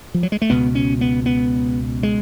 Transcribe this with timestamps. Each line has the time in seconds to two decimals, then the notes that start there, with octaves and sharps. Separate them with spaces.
0.14 F3
0.23 F#3
0.32 G#3
0.42 A3
0.50 C#2 B2 B3
0.75 C#4
1.01 B3
1.26 B3
2.03 G#3